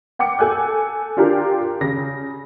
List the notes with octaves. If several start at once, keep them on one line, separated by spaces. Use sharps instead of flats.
F#5 G5 D6 C#7
A4 G#5 F#6 G6
D4 F4 G4 A#4
C#3 A#6